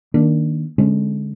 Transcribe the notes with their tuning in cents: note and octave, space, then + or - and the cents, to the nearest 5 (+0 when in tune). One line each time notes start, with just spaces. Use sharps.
D#3 +0 A#3 +0 D4 +0
D3 -15 G#3 +0 C#4 -40